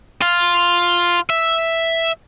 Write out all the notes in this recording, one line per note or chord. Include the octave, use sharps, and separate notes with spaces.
F4
E5